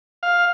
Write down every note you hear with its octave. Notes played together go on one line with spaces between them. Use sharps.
F5